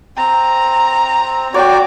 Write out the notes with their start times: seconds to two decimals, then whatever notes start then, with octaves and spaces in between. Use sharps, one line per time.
0.18 C4 A#5
1.54 F#4 C#5 D5 G5